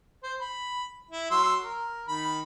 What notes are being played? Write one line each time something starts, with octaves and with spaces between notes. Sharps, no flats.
C5
B5
E4
F#3 C6 E6
A#4
D#3 B5